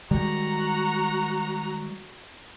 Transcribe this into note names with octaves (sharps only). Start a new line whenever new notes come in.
D#3 G3 G#3 F#4 A#5